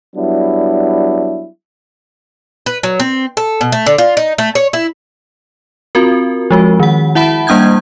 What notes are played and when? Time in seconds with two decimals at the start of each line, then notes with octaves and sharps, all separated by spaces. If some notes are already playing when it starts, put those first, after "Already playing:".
0.16 F#3 G3 B3 D4 E4
2.66 B4
2.83 F#3
3.00 C4
3.37 A4
3.61 B2
3.72 A3
3.86 D3
3.98 F4
4.17 D#4
4.38 A3
4.55 C#5
4.73 E4
5.95 C4 F4 F#4 A#4
6.51 F3 G#3 F#4
6.80 D#3 F#5
7.15 E4 E5 F#5 A5 B5
7.47 G3 A#3 D4 D#6 G6 G#6